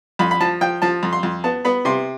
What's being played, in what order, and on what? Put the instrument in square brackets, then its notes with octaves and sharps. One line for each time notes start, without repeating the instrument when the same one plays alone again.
[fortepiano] F2 B5
B5
F3 A5
F3 G5
F3 A5
F2
C6
F2
B3 A5
B3 B5
C3 C6